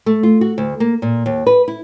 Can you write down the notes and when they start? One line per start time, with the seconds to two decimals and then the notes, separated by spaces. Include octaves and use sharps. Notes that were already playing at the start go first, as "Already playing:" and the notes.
0.06 A3
0.23 F4
0.41 F#4
0.58 D2
0.80 A#3
1.02 A#2
1.26 D#2
1.47 B4
1.68 E4